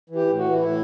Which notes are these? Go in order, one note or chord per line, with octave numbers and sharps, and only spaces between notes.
E3
G4
A2
F#4
E3
A2 E4